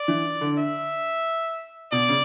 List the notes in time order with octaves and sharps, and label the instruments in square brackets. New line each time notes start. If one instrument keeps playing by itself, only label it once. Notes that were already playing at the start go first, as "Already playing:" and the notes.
Already playing: [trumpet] D5
[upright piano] E3
D3
[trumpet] E5
[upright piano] B2 [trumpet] D5
[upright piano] C#3